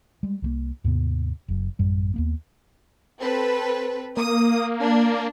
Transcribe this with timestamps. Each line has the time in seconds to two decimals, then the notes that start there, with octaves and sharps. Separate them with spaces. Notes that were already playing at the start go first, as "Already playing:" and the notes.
0.23 G3 G#3
0.42 C2 F3 A#3
0.84 D#2 G#2 C3 B3
1.48 F#1 F#2
1.79 A1 F#2 G3
2.14 D#2 A#3 B3
3.19 C4 A4 B4
4.17 A#3 D#6
4.81 D4